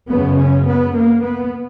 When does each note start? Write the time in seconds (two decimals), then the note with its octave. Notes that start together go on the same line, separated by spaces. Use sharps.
0.10 F#2 C#3 B3
0.39 C#4
0.67 B3
0.96 A#3
1.24 B3